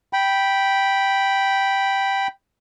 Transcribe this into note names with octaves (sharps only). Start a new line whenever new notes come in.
G5 B5